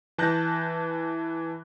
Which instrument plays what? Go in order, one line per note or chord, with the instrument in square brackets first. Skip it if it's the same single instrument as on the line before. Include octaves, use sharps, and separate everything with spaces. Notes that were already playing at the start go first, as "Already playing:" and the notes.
[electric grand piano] E3 A5 F#6 G6 A#6